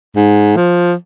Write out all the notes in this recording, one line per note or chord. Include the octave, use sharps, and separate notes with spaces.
G#2
F3